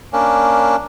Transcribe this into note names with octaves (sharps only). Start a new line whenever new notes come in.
A#3 C#4 D4